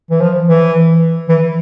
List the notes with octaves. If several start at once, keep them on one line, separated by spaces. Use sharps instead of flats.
E3
F3
E3
E3